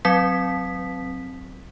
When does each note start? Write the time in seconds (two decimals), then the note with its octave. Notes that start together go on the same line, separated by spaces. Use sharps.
0.05 F#3 C4 B6